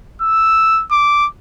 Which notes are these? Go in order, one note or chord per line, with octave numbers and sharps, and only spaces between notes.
E6
D6